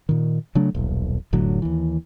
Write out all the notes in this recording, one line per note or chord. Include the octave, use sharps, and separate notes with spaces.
A#2 D#3
C#3 F#3 A3 D4
D#1 B1
F1 A2 D3 F#3
D#2 E3